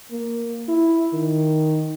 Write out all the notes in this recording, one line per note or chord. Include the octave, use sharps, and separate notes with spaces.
A#3
E4
D#3